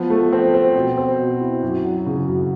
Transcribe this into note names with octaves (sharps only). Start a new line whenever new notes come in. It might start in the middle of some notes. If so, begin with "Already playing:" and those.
Already playing: F3 B3
A3
C4
C4
B2
C4
B2
E4
F#2
F#3
C#3
F#2